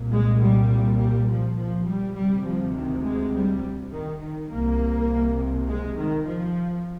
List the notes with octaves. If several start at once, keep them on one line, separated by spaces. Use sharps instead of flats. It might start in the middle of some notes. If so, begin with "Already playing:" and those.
Already playing: C2 A#2
G#3
G3
G3
F3
F3
G3
D2 C3 G3
F3
D#3
G#3
G3
D#3
D#3
C2 C3 A#3
G#3
D#3
F3